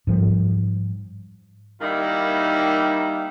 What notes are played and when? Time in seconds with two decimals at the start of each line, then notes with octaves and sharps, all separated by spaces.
0.07 G#2 F3 G3
1.81 D#3 G3 A#3 D#4 E4